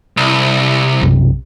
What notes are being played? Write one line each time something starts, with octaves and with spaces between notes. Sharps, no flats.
C2
B1 F#2 C3